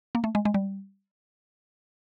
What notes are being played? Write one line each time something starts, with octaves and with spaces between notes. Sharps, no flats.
A#3
A3
G#3
G#3
G3